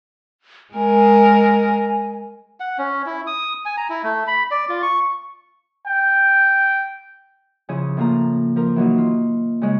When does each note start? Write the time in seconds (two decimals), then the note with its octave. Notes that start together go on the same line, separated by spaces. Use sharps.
0.74 G#3 A#4 G#5
2.60 F#5
2.78 C#4
3.06 E4
3.27 D#6
3.65 G#5
3.77 A#5
3.90 E4
4.03 A3
4.27 B5
4.51 D5
4.69 F4
4.82 C#6
5.86 G5
7.69 C#3 F3 E4 G#4
7.97 A2 A#3 F4 A#5
8.56 F3 A#4
8.76 E3 F#3 A#3 D#4
8.98 F4
9.62 C#3 G#3